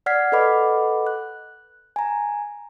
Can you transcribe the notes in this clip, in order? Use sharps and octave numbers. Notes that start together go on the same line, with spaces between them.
D5 F#5 F6 G#6 B6 C7
A4 B4 D#5 F#5 B5 D6
F#6
G#5 A#5